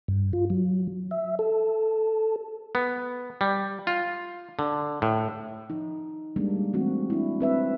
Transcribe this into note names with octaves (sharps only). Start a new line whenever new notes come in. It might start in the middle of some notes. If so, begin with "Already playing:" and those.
G2
F4
F#3
E5
A4
B3
G3
F4
D3
A2
F3 D#4
G3 G#3 A#3 D4
E3 A3 A#3 C4 F#4
D4 E4
C4 B4 E5